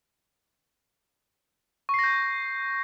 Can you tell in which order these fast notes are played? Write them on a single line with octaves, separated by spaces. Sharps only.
C#6 C7 A#6 G6